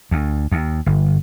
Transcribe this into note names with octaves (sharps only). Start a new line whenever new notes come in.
D2
D#2
G1